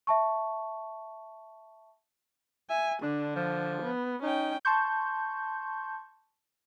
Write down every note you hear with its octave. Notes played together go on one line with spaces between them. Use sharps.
E5 A5 C#6
E5 G#5
D3 D4
F3
B3
C#4 D#4 G5
A5 C6 C#6 G6